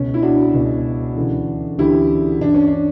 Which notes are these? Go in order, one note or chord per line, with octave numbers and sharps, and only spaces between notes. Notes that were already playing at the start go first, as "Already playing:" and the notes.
Already playing: C#2 B2 C#4
E4
D4 F#4
C#2 B2
D2 C#3 E3
D2 C#3 E3 E4 G4
G2 E3 D4
C#4
D4